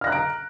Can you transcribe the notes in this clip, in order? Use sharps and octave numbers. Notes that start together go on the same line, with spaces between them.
A#5 F6 F#6 A#6 D7